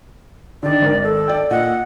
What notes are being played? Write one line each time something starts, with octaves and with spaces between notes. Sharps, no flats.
D3 D#3 D5
G#1 A#4
A4
D5 G5
A#2 D#5 F#5